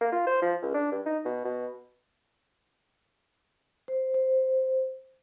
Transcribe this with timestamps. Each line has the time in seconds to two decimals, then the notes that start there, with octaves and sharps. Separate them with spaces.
0.01 A#3
0.12 F4
0.27 C5
0.42 F3
0.62 C#2
0.74 D4
0.92 G2
1.06 D#4
1.25 B2
1.45 B2
3.88 C5
4.14 C5